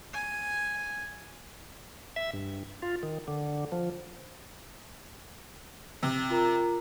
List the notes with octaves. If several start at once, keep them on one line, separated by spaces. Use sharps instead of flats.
G#5
E5
G2
F4
D#3
D3
F3
C3
F4 A#4 A#5